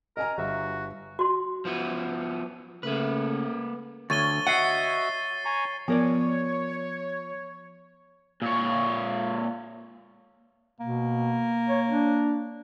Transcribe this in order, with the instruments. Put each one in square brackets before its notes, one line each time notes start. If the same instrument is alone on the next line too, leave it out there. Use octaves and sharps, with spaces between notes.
[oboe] A#4 [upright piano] D#5 G#5 A#5
[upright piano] G1 E5 [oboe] F#4
[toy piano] F#4 C6
[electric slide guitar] F3 B3 E4
[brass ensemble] C#3 A3 [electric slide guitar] A#3 B4
[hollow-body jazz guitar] D2 [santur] C#5 [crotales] A6 D#7 G7
[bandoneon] F#4 D#5 E5 [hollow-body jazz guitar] F#5 [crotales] C7 D#7
[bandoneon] G#5 A#5 C#6
[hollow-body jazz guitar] F3 A#4 D5 [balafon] B3 [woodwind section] C#5
[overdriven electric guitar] A#2 C#5
[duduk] B2 [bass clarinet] A#3
[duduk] C#5
D4